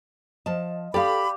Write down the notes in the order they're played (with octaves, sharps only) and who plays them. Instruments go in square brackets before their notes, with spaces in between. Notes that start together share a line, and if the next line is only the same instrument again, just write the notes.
[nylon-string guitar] F3 A5 [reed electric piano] D#5
[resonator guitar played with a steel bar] G4 [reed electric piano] A4 [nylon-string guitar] D5 F5 [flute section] B5